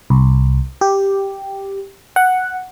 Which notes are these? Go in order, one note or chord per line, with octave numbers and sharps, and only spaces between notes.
C2
G4
F#5